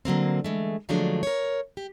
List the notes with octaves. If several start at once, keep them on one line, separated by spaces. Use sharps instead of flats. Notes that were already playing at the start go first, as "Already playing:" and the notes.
D3 F#3 A#3 C4
E3 G#3 A3
D3 F3 F#3 G#3 A3 D4
A#4 C#5
G4